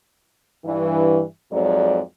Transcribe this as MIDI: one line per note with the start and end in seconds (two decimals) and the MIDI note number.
0.65 1.22 43
0.65 1.22 52
1.52 1.99 41
1.52 1.99 44
1.52 1.99 54
1.52 1.99 74